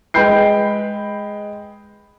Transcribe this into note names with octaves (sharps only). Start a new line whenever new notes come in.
G#3 B4 G5 B5 G6 C7